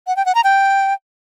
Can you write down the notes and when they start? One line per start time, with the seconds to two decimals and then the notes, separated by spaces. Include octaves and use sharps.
0.07 F#5
0.16 G5
0.26 F#5
0.35 A#5
0.44 G5